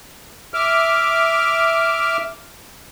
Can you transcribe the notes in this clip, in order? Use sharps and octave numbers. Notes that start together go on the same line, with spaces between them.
E5 D6 F6